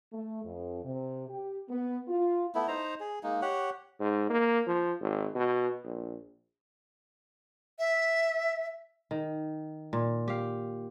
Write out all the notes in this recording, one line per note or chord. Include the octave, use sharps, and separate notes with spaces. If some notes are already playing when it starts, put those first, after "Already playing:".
A3
F2
C3
G4
B3
F4
A3 B3 E4
D#4 C5 A#5
G#4
G#3 A#3 D#4
G4 C#5 F#5
G#2
A#3
F3
G#1
B2
A#1
E5
D#3
A#2
G4 F5